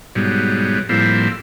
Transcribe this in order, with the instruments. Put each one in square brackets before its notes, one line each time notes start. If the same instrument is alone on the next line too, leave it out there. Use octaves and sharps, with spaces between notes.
[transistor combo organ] G#2 B2 F#3 G3
A2 F3 G3 A#3 C4 E4